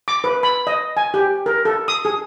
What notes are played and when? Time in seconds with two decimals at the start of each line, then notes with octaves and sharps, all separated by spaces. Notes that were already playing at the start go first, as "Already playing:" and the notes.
0.08 D6
0.24 B4
0.43 B5
0.67 D#5
0.97 G#5
1.14 G4
1.46 A#4
1.65 A4
1.88 D#6
2.05 G#4